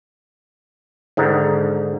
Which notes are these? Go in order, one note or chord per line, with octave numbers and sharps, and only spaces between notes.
G#2 D3 D#3 D#4